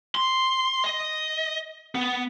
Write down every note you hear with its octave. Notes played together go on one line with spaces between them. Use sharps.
C6
D#5
B3